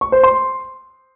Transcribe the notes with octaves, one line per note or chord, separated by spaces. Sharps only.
C#6
C5
C6